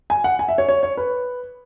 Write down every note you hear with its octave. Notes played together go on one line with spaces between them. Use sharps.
G#5
F#5
G#5
E5
C#5
C#5
C#5
B4